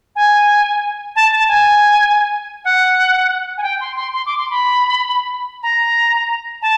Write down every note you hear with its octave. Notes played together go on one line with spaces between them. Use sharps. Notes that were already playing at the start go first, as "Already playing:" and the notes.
G#5
A5
A5
G#5
F#5
G#5
G5
C6
C6
C6
D6
C6
B5
A#5
A5